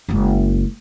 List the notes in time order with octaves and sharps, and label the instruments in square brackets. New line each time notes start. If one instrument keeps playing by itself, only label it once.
[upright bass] F#1 G#3